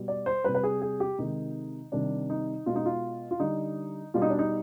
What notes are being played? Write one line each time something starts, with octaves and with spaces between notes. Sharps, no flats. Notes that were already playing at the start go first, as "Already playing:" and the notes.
Already playing: B2 G3
D5
C5
C3 G3 B4
B4
G#4
G#4
G4
C3 D#3 G#3 D#4
C3 D#3 G3 D4
D#4
B2 G#3 F4
D#4
F4
F4
D3 G3 D#4
B2 G3 F4
D#4
D4
D#4